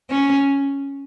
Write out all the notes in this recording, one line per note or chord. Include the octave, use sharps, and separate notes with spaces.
C#4